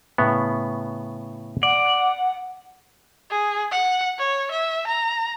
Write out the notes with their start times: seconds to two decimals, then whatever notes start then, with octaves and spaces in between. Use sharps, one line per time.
0.18 A2 C#3 B3
1.63 D5 F#5
3.31 G#4
3.72 F#5
4.18 C#5
4.51 E5
4.87 A#5